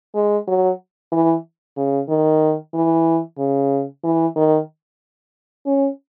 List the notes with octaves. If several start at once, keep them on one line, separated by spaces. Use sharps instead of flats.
G#3
F#3
E3
C#3
D#3
E3
C#3
E3
D#3
C#4